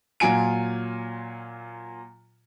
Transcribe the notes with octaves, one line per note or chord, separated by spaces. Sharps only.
A#2 F#3 F4 G#5 D7